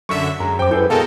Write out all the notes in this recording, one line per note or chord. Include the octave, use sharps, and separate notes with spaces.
F#2 D3 E5 C#6
F#2 G#3 A#5
F2 C5 G5 D6
E4 G#4 A4 B4 G6
B2 G#3 A4 A#4 D#5 F5 G5 A5